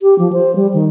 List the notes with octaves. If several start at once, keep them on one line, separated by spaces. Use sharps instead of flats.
G4
F3
C5
G3
D#3